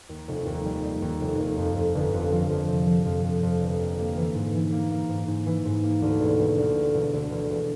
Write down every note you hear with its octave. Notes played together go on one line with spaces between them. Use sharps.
D#2
F1
D#2
G3
G3
D#2
F1
D#2
F2
F2
G1
F2
F3
F2
C3
F3
F2
F2
F2
G1
A#3
A#3
E3
G#2
E3
A#3
A#3
G#2
G#2
E3
G#2
A#3
D2
E1
E1
D2
E1
E1
D2
E1
E1